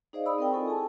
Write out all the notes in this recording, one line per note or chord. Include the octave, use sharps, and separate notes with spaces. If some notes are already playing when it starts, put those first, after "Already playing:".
D#4 G#4 C5 D5 D#5 F5
D5 F5 B5 D#6 E6
C4 A#4 G5
E4 F4 A4 G#5 C#6
G#4 G#5 A5